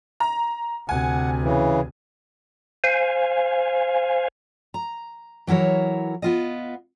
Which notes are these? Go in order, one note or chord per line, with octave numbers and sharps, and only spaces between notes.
A#5
D2 C3 F#5 G#5
C#3 E3
C5 F5 G#5
A#5
E3 F#3 E4 A#4 C#5
B3 F4 D#5